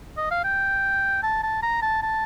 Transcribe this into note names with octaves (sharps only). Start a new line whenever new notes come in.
D#5
F5
G5
A5
A5
A#5
A5
A5